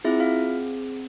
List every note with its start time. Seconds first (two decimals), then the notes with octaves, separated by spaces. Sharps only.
0.05 C4 E4 F4 G#4 E5
0.20 F4 F5